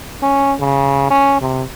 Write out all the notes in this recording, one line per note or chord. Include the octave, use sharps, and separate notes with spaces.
C#4
C#3
C#4
C3